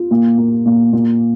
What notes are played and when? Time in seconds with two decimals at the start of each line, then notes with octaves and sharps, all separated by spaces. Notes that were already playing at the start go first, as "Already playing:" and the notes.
Already playing: F4
0.11 A#2
0.37 A#3
0.65 A#2
0.93 A#2